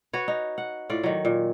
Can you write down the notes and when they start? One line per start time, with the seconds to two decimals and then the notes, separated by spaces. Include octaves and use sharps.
0.13 F#4 B4 C#5
0.28 D#4
0.58 F#5
0.90 A2 F4 D5
1.04 D#3 F#3
1.25 A#2